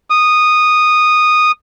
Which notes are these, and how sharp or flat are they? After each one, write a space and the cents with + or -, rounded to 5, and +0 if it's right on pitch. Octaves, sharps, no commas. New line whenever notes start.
D#6 -10